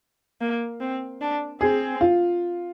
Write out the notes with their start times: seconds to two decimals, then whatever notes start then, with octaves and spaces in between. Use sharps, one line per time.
0.41 A#3
0.80 C4
1.21 D4
1.61 C4 G#4
2.01 F4